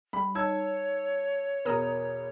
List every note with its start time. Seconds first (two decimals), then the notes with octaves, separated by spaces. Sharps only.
0.13 G3 B5
0.35 D#4 C#5 A5 E6 G#6
1.65 E2 B2 A#4 A#5 D#6